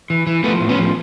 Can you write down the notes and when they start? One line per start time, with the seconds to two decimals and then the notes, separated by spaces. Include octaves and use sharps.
0.10 E3
0.27 E3
0.44 F3 A3 B3
0.61 A2
0.69 B3 C#4
0.78 F3